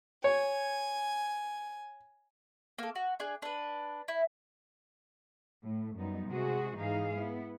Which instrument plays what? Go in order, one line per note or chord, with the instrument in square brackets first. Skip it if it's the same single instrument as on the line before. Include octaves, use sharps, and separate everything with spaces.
[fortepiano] C#5 [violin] G#5
[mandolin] A#3 A4
F#4
D4 G#4
D4 B4
E4
[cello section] A2 A3
F#2 G3 B3 D#4
C3 G#3 F#4 G#4
G#2 E3 D#4 G#4 F5
B3 E4